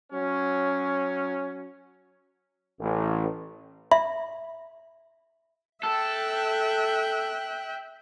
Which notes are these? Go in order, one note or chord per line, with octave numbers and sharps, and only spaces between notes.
F#3 C#4
A1
E5 B5
A4 E5 G5 F#6